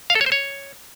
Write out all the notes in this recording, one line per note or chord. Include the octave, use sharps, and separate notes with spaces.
F5
A4
C#5
C5
C#5